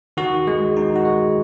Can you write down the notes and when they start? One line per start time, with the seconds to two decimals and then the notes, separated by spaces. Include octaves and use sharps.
0.17 D#3 F#4
0.47 G#3
0.76 D#3 D#4
0.96 F#4
1.05 G#3